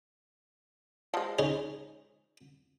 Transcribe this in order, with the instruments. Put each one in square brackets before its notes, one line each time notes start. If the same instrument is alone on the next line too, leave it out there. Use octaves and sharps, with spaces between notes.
[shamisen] F3 G#3
[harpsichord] C#4 D#4 G#4